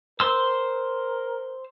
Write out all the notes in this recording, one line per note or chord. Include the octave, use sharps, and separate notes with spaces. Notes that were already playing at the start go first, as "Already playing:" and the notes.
A#4 C5 C6 E6